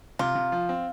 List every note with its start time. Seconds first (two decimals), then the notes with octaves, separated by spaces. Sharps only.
0.19 C3 F4
0.35 C3
0.52 F3
0.69 C4